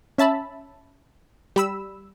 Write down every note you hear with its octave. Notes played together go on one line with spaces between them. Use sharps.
C#4 E5 A5 B5
G3 B5 E6